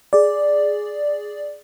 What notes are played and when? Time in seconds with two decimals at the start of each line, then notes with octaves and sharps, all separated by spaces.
0.13 G#4 D5